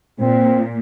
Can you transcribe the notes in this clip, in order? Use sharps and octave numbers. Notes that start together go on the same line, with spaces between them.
A#2 C4